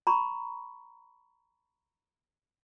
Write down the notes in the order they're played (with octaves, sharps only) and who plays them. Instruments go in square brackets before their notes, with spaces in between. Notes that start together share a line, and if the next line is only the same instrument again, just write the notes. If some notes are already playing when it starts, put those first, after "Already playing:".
[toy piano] A#5 B5 C#6